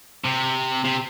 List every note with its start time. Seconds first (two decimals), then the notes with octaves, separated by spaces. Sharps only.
0.24 C3
0.85 C3